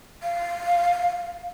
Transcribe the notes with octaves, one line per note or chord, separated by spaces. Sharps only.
F5